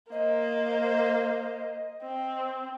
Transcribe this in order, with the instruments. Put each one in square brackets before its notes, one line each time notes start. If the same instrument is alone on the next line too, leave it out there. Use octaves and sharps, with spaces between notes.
[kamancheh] A#3 C5 [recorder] D#5
[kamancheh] C4